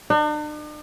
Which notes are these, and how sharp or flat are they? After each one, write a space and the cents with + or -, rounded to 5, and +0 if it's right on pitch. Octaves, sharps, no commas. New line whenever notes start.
D4 +45